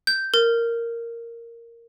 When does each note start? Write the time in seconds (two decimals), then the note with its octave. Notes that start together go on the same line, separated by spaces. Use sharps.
0.07 G6
0.34 A#4